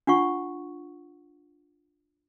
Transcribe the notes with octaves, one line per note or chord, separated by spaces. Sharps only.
D4 F4 F#5 C#6